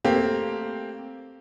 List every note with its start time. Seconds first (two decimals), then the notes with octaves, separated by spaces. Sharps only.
0.05 A3 A#3 C4 G4